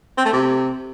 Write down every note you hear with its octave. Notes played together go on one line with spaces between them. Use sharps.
C4
A3
C3